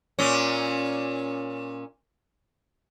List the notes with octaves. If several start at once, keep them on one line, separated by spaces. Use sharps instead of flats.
A#2 C#4